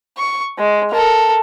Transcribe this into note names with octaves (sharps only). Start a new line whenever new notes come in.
C#6
G#3
A4 A#4